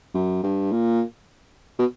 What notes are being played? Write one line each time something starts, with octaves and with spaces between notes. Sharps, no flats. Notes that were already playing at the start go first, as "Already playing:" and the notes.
F#2
G2
A#2
B2